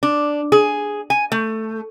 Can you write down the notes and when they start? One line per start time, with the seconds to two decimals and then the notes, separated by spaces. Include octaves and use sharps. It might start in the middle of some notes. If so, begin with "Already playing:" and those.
0.03 D4
0.52 G#4
1.10 G#5
1.32 A3